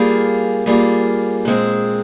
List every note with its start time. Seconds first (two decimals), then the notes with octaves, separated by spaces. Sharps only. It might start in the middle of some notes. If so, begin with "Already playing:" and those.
Already playing: G3 A#3 F4 G#4
0.66 G3 A#3 F4 G#4
1.45 A#2 G#3 C4